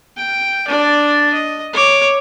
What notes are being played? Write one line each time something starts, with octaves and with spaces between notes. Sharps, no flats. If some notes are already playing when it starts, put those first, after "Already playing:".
G5
D4 D5
D#5
C#5 D6